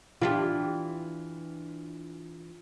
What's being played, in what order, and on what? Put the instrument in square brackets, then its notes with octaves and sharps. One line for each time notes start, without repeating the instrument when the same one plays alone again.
[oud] E3 D4 G4 [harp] F4